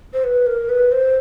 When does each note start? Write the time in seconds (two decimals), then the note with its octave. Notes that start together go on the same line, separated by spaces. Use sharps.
0.13 C5
0.24 B4
0.47 A#4
0.69 B4
0.92 C5